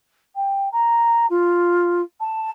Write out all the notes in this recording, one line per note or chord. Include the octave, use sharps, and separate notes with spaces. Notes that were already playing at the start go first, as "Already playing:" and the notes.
G5
A#5
F4
A5